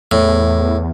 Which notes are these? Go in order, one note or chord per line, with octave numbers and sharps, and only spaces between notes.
E2 A2